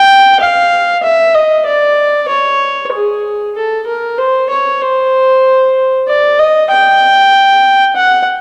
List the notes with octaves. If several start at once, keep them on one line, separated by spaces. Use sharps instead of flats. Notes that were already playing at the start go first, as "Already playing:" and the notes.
Already playing: G5
F5
E5
D#5
D5
C#5
G#4
A4
A#4
C5
C#5
C5
D5
D#5
G5
F#5